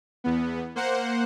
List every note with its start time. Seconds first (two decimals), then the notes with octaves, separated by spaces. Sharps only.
0.24 E2 B3
0.75 A#3 C5 F#5